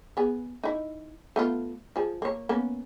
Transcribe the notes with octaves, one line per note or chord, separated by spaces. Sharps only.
B3 G#4
D#4 E4
A3 B3 F4
F3 G#4
A#3 C#5
A#3 B3 C#4